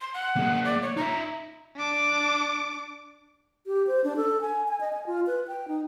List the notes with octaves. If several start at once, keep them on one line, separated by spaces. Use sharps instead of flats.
C6
F#5
A#3 G#4
D5
C#5
D#4 E5 A#5
D4 D6
G4
C5
D4
A4
G#5
G#5
D#5
G#5
F4
B4
G5
D#4